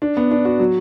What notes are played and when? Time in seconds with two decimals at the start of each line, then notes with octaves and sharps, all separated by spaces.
0.02 D4
0.17 B3
0.31 D4
0.45 F#4
0.60 F#3